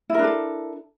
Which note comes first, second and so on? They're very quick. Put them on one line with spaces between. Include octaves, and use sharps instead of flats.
E4 A#4 D4 A4